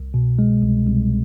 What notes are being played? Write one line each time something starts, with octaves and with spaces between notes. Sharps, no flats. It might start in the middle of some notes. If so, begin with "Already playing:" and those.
Already playing: C2
B2
G#3
C2
C2